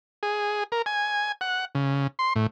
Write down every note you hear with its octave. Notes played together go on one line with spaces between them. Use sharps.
G#4
A#4
G#5
F#5
C#3
C6
A2